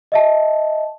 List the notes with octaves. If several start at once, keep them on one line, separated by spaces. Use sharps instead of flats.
D#5 E5 A5